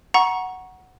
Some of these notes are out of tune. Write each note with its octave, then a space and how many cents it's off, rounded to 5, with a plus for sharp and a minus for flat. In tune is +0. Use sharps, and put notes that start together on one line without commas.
F#5 +0 A#5 +25 C#6 +0